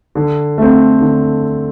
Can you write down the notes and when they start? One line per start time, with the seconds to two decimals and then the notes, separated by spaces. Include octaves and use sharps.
0.15 D3
0.58 A3 C4
1.01 D3